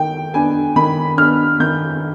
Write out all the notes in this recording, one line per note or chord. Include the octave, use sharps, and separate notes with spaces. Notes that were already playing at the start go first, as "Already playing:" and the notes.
Already playing: D#3 G5
B3 D4 G#5
D#3 B5
B3 D4 F6
D#3 G6